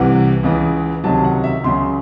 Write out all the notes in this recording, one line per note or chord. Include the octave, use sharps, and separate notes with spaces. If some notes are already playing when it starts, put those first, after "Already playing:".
Already playing: C2 C3 E3 F#5
C#2 C#3 E3
C#2 C3 D#3 F#3 A5
F#5
E5
C#2 C#3 F#3 C6